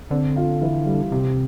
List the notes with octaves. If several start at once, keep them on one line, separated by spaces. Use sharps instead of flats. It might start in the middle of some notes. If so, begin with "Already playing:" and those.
D3 C4
F4
E3
G3
C3 G4